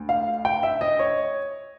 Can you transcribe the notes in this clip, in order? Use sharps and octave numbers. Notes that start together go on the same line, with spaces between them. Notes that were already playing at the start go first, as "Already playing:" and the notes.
Already playing: D2
F5
G5
E5
D#5
C#5